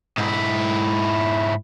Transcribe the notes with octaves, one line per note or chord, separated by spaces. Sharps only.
G#2 E4